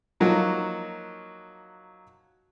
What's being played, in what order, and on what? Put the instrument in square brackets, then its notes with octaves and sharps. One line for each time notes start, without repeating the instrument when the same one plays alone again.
[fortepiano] F3 F#3 A#3 D#4 F#4